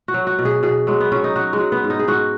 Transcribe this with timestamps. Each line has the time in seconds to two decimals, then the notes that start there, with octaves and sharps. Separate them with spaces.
0.08 F#4
0.14 F#3
0.27 F#4
0.39 B2
0.45 G#4
0.63 B2 G#4
0.87 F#3 G#3
1.01 B3
1.12 F#3 C#4
1.24 D#4
1.36 F#3 F#4
1.53 G#3
1.60 F#3
1.72 B3
1.84 G#2
1.90 D#4
1.99 G#4
2.08 G#2 F#4